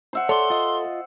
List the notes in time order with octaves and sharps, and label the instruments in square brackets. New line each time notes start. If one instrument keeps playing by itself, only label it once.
[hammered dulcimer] C5 E5 F#5
[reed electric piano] A4 [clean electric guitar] C#5 D5 [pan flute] C6
[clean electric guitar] F4 D#5